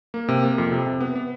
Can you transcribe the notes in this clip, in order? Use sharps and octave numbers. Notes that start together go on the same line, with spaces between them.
A#3
C3
A#3
F2
C3
C3
B3
B3